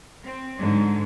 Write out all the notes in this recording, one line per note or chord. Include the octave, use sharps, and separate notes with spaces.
C4
G#2 D3 F#3